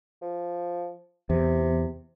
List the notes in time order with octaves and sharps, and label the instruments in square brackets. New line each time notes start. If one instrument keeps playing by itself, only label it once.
[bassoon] F3
[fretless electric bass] E2 [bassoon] C3